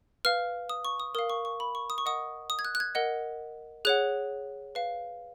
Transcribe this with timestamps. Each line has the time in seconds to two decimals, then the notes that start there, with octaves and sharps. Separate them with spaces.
0.25 B4 F5 F6
0.70 D#6
0.85 C#6
1.00 D#6
1.15 A#4 F5 D#6
1.30 C#6
1.45 C#6
1.60 B5
1.75 C#6
1.90 D#6
1.98 C#6
2.05 A#4 D#5 F#5 D#6
2.50 D#6
2.59 G#6
2.65 F#6
2.75 F#6
2.80 G#6
2.95 A#4 D#5 F#5
3.85 G#4 C#5 F#5 F#6
4.75 B4 F5